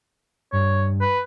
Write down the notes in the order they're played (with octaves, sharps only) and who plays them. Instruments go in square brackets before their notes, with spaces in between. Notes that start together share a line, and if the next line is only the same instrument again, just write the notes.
[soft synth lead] G2 [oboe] C#5
[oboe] B4